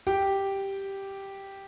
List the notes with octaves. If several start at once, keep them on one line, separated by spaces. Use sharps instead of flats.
G4 G5